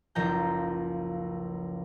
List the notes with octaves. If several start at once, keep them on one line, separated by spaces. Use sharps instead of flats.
F#1 C#2 F3 A#5 G6